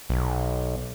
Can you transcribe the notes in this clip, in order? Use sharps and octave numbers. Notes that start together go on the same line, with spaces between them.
B1